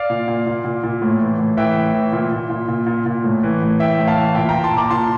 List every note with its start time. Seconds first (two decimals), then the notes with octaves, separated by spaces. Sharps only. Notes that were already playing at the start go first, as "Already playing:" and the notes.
Already playing: D5 F5
0.10 A#2
0.28 A#2
0.46 A#2
0.65 A#2
0.84 A#2
1.02 A2
1.21 E3
1.39 A2
1.57 E3 E5 G5
1.76 A2
1.94 E3
2.12 A#2
2.32 A#2
2.50 A#2
2.68 A#2
2.87 A#2
3.06 A#2
3.24 A2
3.43 E3
3.62 A2
3.79 E3 E5 G5
3.98 A2
4.07 F5 A5
4.17 E3
4.35 A#2 E5 G5
4.49 G5 A#5
4.54 A#2
4.64 A5 C6
4.73 A#2 A#5 D6
4.90 A#2 A5 C6